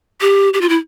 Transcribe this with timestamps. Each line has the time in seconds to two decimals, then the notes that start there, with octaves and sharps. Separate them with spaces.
0.21 G4
0.54 G4
0.61 F4
0.69 E4